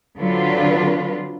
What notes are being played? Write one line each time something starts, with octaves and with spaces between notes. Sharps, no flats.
D3 F#3 C4 D4 F4 B4